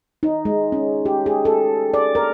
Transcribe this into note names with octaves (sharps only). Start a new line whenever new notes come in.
D#4
G#3
C#4
G4
G#4
A4
D5
A#4